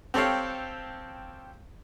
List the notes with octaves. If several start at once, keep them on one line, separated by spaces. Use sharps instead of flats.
C4 G4 A4 C#5 F5